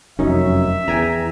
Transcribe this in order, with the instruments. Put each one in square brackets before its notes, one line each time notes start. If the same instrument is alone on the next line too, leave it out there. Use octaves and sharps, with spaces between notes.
[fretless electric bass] F1 F#2 [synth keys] C#4 D#4 [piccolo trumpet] E5
[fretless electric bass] E2 [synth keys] G5 G#5 A#5